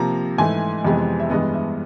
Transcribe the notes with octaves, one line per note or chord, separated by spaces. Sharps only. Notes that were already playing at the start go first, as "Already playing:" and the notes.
Already playing: C3 F3 A#3 A#5
G#2 E3 A3 G#5
F2 C3 E3 G#3 B3
E5
G2 E3 G#3 B3 D#5
E5